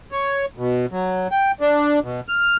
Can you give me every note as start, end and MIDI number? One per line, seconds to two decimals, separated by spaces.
0.12 0.46 73
0.57 0.86 47
0.91 1.28 54
1.32 1.52 79
1.61 2.00 62
2.03 2.20 47
2.29 2.57 89